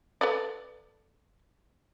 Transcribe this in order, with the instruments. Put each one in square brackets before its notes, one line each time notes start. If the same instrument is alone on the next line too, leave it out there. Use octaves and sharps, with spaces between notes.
[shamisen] A4 B4 D5